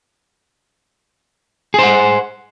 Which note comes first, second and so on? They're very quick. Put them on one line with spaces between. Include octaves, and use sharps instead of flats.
G#4 C5 F#5